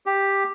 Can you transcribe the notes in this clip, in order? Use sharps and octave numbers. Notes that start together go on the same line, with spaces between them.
G4